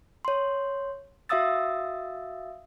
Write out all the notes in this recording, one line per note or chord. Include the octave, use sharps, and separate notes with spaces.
C#5 C6
F#4 E5 F5 D#6 E6 A6